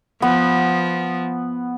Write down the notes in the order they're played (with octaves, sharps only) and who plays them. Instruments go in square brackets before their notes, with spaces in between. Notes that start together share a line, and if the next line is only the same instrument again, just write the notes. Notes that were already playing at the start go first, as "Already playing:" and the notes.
[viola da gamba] F3 [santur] B3